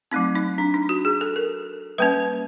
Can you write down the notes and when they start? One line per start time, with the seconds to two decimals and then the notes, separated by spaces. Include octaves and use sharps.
0.11 F#3 A3 C4 D#4
0.35 D#4
0.58 D4
0.74 D#4
0.89 F#4
1.05 G#4
1.21 A4
1.36 A#4
1.98 G3 A#3 C#4 B4